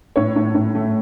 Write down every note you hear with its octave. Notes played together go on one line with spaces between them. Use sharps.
A2 C#5
A2
A2
A3